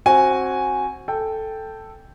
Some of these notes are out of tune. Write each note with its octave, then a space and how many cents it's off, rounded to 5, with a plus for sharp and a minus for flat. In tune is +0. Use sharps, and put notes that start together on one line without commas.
C4 +25 F#4 +0 G#5 +0
A4 +0 G5 +0